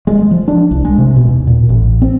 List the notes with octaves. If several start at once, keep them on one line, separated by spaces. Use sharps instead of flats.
G#3
F3
D4
C2
G#3
C3
B2
D#2
A#2
A1
C4